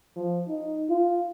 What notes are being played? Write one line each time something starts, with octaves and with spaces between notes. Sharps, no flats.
F3
D#4
F4